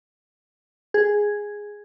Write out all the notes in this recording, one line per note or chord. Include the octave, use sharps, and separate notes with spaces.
G#4